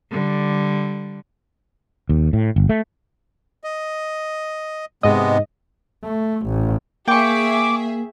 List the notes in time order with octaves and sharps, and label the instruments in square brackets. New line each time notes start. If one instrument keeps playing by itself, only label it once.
[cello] D3 G3
[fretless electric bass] D#2
A2
G1
A3
[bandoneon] D#5
[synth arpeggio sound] G#2 D#5 [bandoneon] C3 G#3 B3
[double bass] A3
A1
[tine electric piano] A#3 [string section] G#4 E5 [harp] G5 C#6 [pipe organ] D6